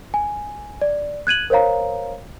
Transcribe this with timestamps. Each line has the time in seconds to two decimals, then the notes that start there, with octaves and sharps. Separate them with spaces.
0.14 G#5
0.81 D5
1.27 F#6 G#6 D#7 F#7
1.50 A#4 C5 C#5 F5 A#5